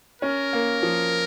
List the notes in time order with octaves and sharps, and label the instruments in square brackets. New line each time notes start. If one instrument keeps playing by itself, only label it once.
[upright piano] C#4 [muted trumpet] A#4
[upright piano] A#3
F3